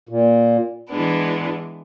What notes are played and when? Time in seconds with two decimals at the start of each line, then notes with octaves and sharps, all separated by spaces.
0.09 A#2
0.89 E3 G#3 B3 D4